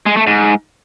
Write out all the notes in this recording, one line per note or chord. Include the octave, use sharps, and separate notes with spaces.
G#3
A3
G#2